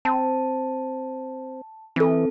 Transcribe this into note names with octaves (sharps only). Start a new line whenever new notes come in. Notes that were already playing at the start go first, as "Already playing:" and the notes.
C4 A5
E3 C4 A4